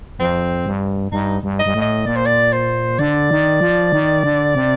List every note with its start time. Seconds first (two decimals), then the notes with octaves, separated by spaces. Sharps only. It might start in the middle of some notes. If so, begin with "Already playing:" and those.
0.19 F2 C4
0.66 G2
1.12 G2 D#4
1.43 G2
1.59 D#5
1.66 G2
1.74 A2
1.82 D#5
2.06 A#2 D5
2.16 C5
2.26 D5
2.53 C5
2.99 D3 D5
3.31 D#3
3.61 F3
3.92 D#3
4.23 D3
4.55 C3